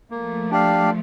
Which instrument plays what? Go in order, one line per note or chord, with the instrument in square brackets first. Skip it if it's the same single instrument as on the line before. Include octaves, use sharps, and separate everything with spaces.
[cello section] F3 A3 [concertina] A#3
[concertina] D4 G4 D5 F5